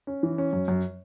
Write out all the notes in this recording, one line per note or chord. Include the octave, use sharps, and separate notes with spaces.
C#4
E3
C#4
F#2
F#2